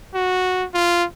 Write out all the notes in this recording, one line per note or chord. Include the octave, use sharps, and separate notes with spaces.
F#4
F4